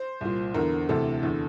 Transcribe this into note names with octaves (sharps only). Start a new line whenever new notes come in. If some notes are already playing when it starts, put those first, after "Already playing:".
Already playing: C5
C2 A#2
E2 D3 A#4
D2 C3 E3 A4
E2 D3